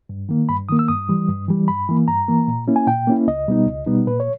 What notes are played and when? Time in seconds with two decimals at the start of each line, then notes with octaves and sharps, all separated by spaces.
0.09 G2
0.29 D#3 A#3
0.49 G2 B5
0.69 D#3 A#3 D#6
0.79 E6
0.88 G2 D#6
1.09 E3 G3
1.29 G2
1.48 E3 G3
1.68 G2 B5
1.89 E3 A#3
2.08 G2 A#5
2.28 E3 A#3
2.48 A#2
2.68 A#3 C#4 E4
2.76 G#5
2.87 A#2 G5
3.07 A#3 C#4 E4
3.27 C#2 D#5
3.48 B2 G3 B3 D#4
3.67 C#2
3.87 B2 G3 B3 D#4
4.07 A#2 B4
4.20 C#5